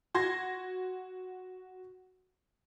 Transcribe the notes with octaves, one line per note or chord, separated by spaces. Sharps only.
F#4 C6 G#6 A#6